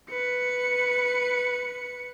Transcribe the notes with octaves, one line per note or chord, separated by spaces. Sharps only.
B4 C#7